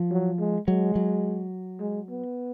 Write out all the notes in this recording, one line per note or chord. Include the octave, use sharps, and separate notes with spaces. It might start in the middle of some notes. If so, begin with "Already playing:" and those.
Already playing: F3
F#3
G#3
F#3 G#3
F#3
G#3
B3